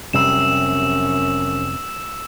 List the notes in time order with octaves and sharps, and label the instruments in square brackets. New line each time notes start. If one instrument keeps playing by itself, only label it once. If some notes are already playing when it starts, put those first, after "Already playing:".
[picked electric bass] F1 C3 G3 [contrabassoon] F#2 [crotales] E6 E7